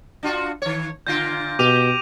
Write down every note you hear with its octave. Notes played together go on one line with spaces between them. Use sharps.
D4 F4 F#4
D#3 C#5
A#2 D3 F4 G6 A#6 D7
B2 G4 D6 D#7 F7